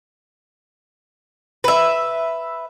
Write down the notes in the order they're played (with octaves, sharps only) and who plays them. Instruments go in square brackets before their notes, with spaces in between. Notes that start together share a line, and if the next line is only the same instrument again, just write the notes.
[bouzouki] B4 E5